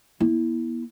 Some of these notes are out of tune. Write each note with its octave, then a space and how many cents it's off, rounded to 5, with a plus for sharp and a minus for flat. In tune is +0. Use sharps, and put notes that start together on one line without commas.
B3 -40 E4 -15